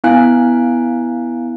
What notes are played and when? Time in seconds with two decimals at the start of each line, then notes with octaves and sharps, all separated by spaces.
0.04 B3 E4 F5 G#5 F#6